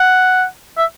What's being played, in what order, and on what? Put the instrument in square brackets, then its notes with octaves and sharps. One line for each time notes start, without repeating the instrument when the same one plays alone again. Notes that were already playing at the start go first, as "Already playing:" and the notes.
Already playing: [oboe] F#5
E5